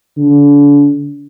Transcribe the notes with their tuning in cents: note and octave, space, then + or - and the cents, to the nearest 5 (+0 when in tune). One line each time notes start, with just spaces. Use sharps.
D3 -35